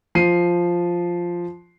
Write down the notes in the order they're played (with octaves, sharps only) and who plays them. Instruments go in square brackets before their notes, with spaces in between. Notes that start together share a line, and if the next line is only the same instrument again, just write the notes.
[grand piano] F3 C7 D#7